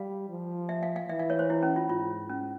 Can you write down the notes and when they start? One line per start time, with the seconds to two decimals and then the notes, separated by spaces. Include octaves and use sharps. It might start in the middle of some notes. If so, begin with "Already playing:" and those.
Already playing: G3 F5
0.29 F3
0.69 E5
0.83 F5
0.96 F5
1.09 E3 E5
1.19 F5
1.30 C#5
1.39 C5
1.50 E4
1.63 C#4
1.76 F4
1.89 G#2 F4
2.30 C#4